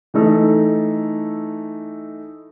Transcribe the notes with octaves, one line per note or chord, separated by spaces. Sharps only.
E3 A3 D#4 A4